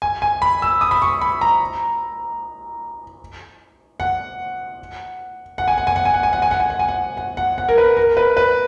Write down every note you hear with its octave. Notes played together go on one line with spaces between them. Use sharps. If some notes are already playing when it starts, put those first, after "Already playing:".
G#5
G#5
B5
E6
D#6
B5
C#6
B5
A#5
F#5
F#5
G#5
F#5
G#5
F#5
G#5
F#5
G#5
F#5
G#5
F#5
G#5
F#5
G#5
F#5
F#5
F#5
F#5
A#4
B4
A#4
B4
B4